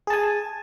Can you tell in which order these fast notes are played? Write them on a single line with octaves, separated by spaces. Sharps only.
G#4 A5 G#5